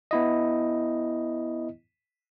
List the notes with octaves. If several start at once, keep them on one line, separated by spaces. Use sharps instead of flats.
B3 E4 D#5